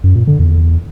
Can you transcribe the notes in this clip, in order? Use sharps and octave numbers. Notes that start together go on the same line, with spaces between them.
F#2
A#2
D3
E2